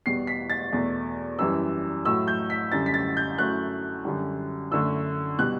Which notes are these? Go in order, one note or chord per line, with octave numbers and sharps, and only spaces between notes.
E2 B2 G3 C7
B6
A6
E2 B2 A3
F#2 E3 G3 E6
A2 F#3 A3 E6
G6
B6
F#2 D3 G3 A6
B6
A6
G6
F#2 F#3 A3 F#6
F#2 D3 G3
F#2 D3 A3 E6
B2 G3 F#6